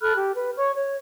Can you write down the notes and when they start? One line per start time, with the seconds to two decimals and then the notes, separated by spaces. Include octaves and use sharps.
0.01 A4 B5 F6 F#6
0.16 G4
0.35 B4
0.58 C#5 C#6
0.76 C#5